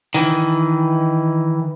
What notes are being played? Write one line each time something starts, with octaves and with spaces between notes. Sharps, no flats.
D#3 E3